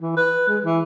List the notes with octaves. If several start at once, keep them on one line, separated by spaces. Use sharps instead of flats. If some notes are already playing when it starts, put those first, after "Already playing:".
E3
B4
G#3
E3